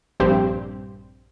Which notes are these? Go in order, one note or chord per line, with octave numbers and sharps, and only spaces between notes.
A#1 G2 C4 G4